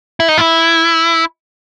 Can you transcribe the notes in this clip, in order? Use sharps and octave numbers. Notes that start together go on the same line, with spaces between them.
E4
D#4
E4